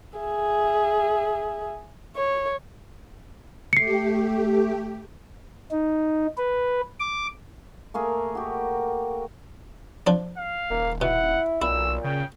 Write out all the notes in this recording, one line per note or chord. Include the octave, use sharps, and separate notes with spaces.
G#4 E5
C#5
A3 G4 C7 C#7
D#4
B4
D6
A3 A#3 G#4 A#4
F#4 G4
F3 D4
F5
D#1 A#3
B2 E4 F#5
B1 A#2 E4 E6
C#3 G5